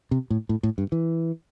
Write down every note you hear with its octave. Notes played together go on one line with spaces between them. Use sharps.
C3
A2
A2
A2
G2
E3